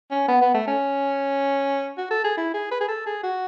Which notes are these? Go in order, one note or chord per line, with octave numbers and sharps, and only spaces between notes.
C#4
B3
B3
A3
C#4
F#4
A4
G#4
E4
G#4
B4
G#4
A4
G#4
F#4